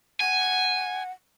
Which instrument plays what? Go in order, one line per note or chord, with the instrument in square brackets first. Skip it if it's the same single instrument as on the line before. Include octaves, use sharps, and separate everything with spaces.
[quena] F#5 [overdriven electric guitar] G#5